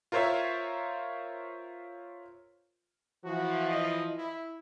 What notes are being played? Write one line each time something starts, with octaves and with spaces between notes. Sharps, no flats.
F4 A#4 C5 C#5 E5
E3 F3 F#4
D#5
E4